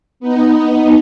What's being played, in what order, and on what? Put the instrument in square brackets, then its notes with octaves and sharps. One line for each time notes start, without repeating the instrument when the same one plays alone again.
[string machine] B3 D#4